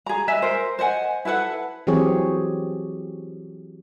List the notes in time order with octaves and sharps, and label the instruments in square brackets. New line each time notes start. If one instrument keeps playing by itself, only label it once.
[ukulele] G#4 A#5
B4 D#5 E5 G#5
A#4 C5
C5 D#5 F#5 G#5
E4 A4 B4 F#5
[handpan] E3 F#3 C4 G4 G#4 C#5